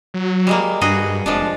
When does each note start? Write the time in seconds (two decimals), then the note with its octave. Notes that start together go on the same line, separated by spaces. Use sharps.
0.14 F#3
0.47 G3 G#3 A#3
0.81 G2 F#4 G#4 D#5
1.26 F1 F3 G#3 D4